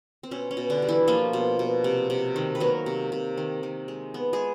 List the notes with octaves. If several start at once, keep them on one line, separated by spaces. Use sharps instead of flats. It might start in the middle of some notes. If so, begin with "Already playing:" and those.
C4
B2 C#4
C#4
B2
D3 D4
G3
E3 E4
F3 A#3 F4
B2
B2
C3
C3
D#3
B4
F#3 A#3 A#4
C3
C3
D#3
D#3
G#3
B3
G#3 G#4